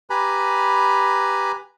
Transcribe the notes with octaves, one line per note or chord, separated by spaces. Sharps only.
G4 B4 G#5 A#5 B5